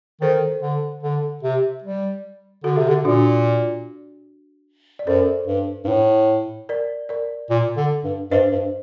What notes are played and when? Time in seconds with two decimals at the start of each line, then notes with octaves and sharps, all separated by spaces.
0.22 D#3 A4 C5
0.62 D3
1.03 D3
1.43 C3
1.84 G3
2.64 D3 F#4 A4
2.77 C3
2.89 D3
3.05 A#2 D4 F#4
4.99 D5
5.07 F#2 A4 C5
5.47 G2
5.85 G2
5.89 A2
6.69 A#4 D5
7.09 A#4 D5
7.50 A#2
7.77 D3
8.04 G2
8.31 G2 C5 D#5
8.52 G2